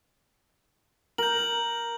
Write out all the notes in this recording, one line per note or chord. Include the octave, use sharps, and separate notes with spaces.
A#4 G6 F#7